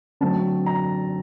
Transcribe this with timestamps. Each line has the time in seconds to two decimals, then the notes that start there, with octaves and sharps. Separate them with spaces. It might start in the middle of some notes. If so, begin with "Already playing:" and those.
0.21 D3 F#3 A3 C4 A5
0.66 A#5